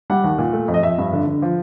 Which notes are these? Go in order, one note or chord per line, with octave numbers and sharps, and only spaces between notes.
G3 F#5
D#2
A#2
A3
F2
D#5
F2 E5
G2
D3
D3
F3